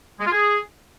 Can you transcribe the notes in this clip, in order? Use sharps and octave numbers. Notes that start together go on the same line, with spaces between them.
G#3
F4
G#4